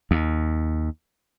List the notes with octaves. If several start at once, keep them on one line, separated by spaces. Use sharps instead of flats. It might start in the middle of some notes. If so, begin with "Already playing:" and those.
D#2